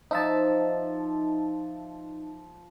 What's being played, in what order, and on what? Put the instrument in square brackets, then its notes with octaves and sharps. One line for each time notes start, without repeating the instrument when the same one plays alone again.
[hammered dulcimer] F3 [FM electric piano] D#4 E5 A5